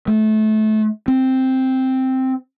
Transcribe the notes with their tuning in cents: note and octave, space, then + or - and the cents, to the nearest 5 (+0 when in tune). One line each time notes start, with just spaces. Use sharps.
A3 -25
C4 +0